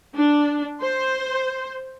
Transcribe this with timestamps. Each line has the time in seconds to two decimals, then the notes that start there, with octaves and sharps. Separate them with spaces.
0.14 D4
0.81 C5